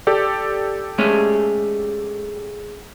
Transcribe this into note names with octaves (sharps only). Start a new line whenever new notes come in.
G4 A4 D5
G#3 A3 C#4